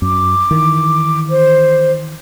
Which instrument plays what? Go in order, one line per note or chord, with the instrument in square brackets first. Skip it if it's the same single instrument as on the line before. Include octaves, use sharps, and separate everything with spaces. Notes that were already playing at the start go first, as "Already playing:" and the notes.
[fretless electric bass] F#2 [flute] D6
[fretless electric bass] D#3 E3
[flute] C5